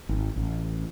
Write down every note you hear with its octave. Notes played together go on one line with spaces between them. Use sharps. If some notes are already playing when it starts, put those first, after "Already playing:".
G#1
A1